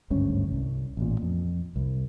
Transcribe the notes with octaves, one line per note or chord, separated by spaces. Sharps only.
G#1 D2 G2 C#4
C2
A1 A#2
F2
C2